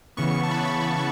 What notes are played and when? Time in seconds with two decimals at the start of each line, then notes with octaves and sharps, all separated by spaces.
0.17 C#3 E3 B3 C#6
0.43 A5
0.51 B5
0.84 B5